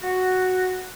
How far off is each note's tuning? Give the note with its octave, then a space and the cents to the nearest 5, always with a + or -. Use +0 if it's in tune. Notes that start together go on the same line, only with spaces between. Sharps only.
F#4 +0